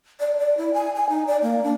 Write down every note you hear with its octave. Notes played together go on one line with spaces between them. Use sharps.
D5
D5
E4
G#5
G#5
D#4
D5
A#3
D4